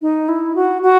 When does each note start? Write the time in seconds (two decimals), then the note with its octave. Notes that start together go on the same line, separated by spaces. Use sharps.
0.02 D#4
0.29 E4
0.55 F#4
0.82 F#4